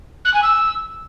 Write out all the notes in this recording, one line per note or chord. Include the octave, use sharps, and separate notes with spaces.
F#6
G#5
E6